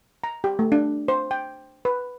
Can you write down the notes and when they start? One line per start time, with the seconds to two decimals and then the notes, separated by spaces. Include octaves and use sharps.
0.24 A#5
0.44 G4
0.59 A3
0.72 D4
1.08 C5
1.31 G5
1.85 B4